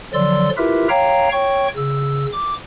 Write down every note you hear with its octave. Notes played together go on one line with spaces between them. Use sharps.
D3 F3 F#3 D5 C6 E6
E4 F4 G4 A#4 B4 E5
C#5 F5 G5 A#5
C#5 G5 C#6
C#3 E6
D6